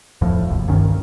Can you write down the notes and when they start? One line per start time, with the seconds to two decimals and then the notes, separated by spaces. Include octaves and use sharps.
0.21 D1 F2 A2 F3
0.50 F#1 C2
0.67 C2 G2 D#3 C#4